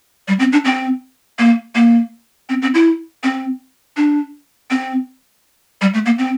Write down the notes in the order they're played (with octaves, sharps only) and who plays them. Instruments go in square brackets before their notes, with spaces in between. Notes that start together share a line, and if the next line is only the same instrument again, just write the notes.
[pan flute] G3
C4
D4
C4
A#3
A#3
C4
C4
E4
C4
D4
C4
G3
A3
A#3
C4